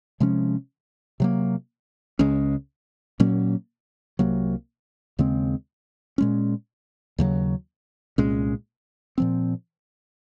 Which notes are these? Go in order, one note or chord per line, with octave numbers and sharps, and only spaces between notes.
C3 F3 G#3 C#4
C3 F#3 A#3
C#2 C#3 G#3 C#4
A#2 F#3 A#3 C#4
C2 C3 F#3 A#3
D#2 C#3 G#3 C4
A#2 G#3 C#4
D#2 C#3 F#3
C2 A#2 G#3 C#4
A#2 F3 C4